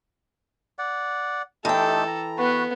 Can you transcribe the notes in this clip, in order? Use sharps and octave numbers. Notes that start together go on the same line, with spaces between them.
D5 F#5
E3 A3 D#4 G4 A4 G5
A#5
B3 F#4 B4